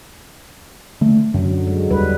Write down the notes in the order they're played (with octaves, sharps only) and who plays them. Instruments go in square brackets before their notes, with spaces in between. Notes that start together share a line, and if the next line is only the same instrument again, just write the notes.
[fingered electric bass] D3 A3
[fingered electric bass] F#2 [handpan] D3 F#3
[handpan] F#3 G#3
[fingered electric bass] E2 [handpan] G3 B4